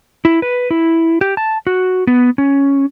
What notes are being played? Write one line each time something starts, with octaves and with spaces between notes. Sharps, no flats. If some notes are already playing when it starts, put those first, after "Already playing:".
E4
B4
E4
G4
A5
F#4
B3
C#4